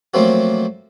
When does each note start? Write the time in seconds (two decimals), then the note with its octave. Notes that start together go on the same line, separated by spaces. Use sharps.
0.14 F3 F#3 A3 A#3 C4 F#4